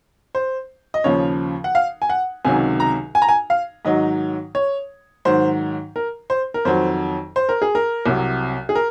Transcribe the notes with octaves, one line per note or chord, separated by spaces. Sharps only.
C5
D#5
D#2 C#3 F3 C#5
F#5
F5
G#5
F#5
C#2 C3 D#3 F#3 G#5
A#5
G#5
A#5
G#5
F5
G#2 D#3 F#3 D#5
C#5
G#2 D#3 F#3 C5
A#4
C5
A#4
F2 D#3 F#3 C5
C5
A#4
G#4
A#4
C2 C3 F#3
G#4
A#4